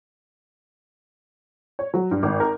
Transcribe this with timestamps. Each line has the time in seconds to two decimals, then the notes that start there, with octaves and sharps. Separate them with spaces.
1.79 C#5
1.94 F#3
2.11 G2
2.23 G#1
2.40 A#4